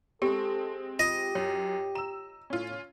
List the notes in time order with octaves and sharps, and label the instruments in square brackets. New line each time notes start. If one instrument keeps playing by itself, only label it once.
[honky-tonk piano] G#3 C4 [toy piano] G4 [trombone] A4
[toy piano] F4 [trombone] G4 [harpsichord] D#5
[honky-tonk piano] F#2 [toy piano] C#5
[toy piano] A#5 [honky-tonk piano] E6 E7
[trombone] A2 [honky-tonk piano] C#4 F4